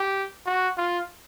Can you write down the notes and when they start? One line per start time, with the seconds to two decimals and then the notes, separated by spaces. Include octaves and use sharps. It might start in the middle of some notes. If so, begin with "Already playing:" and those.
Already playing: G4
0.46 F#4
0.77 F4